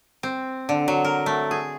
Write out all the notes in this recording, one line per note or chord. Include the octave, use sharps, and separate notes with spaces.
C4
D3
F#3
A#4
A3
G#4